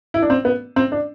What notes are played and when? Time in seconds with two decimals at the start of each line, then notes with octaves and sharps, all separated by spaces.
0.14 E4
0.22 D4
0.30 C4
0.45 B3
0.76 C4
0.92 D4